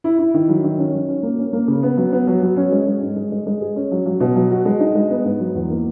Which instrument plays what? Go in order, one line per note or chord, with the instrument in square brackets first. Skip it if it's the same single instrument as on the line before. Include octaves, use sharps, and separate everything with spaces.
[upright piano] E4
E4
D#3
F#3
D#3
C#4
F#3
C#4
A#3
C#4
A#3
C#3
B3
F#3
B3
F#3
F#3
C#4
G#3
G#3
G#2
G#3
G#3
G#3
G#4
C#4
F#3
F#3
B2
F#3
F#4
G#3
D#4
G#3
B3
G#2
F#3
E2
A#3